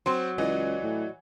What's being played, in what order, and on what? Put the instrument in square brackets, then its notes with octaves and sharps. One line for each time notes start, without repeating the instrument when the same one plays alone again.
[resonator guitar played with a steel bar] F#3 [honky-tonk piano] C4 C5
[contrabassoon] C#2 [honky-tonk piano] E3 [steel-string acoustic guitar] D5 D#5
[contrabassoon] A2